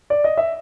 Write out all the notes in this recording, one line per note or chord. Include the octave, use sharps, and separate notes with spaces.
D5
D#5
E5